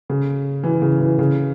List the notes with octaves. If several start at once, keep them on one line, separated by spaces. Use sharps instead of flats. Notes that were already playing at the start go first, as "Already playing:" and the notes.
C#3
E3
C#3
E3
C#3